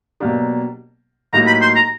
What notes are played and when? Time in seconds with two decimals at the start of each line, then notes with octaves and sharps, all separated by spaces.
0.20 B2 F#3 A#3 D4 G4
1.33 A2 F#3 A#3 D#4 G4 A#5
1.47 B5
1.61 C6
1.76 A#5